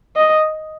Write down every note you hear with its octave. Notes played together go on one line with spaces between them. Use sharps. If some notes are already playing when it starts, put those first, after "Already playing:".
D#5